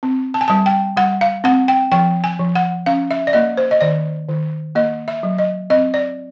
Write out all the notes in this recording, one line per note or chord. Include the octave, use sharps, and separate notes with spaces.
C4
A5
G#5
G3 A5
G5
G3 F#5
F5
C4 F#5
G5
F3 G5
G#5
F3
F#5
C#4 F5
E5
D5
A#3 D#5
C5
D#5
D#3 D5
D#3
A#3 D#5
E5
F#3
D#5
C4 D#5
D5